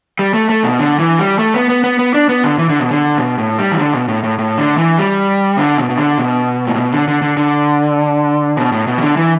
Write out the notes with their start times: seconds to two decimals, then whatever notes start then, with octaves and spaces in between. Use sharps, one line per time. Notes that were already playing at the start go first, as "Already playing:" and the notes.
0.19 G3
0.34 A3
0.49 A3
0.64 B2
0.80 D3
0.99 E3
1.19 G3
1.39 A3
1.54 B3
1.69 B3
1.84 B3
1.99 B3
2.14 D4
2.29 B3
2.44 D3
2.59 E3
2.70 D3
2.80 B2
2.91 D3
3.18 B2
3.38 A2
3.58 G3
3.72 E3
3.79 D3
3.94 B2
4.08 A2
4.24 A2
4.39 A2
4.58 D3
4.78 E3
4.98 G3
5.58 D3
5.78 B2
5.90 B2
5.98 D3
6.18 B2
6.67 A2
6.78 B2
6.92 D3
7.08 D3
7.22 D3
7.37 D3
8.57 B2
8.72 A2
8.87 B2
8.98 E3
9.02 D3
9.17 E3